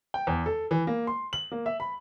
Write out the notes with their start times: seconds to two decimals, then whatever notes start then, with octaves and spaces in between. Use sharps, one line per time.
0.14 G5
0.27 E2
0.46 A4
0.71 E3
0.87 A#3
1.07 C6
1.33 F#7
1.52 A#3
1.66 E5
1.80 B5